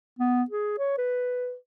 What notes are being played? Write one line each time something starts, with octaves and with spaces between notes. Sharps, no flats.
B3
G#4
C#5
B4